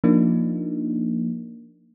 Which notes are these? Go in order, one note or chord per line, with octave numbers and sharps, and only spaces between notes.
F3 A#3 D4 D#4